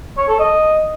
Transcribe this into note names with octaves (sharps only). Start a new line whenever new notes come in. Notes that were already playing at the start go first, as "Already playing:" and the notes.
C#5
A4
D#5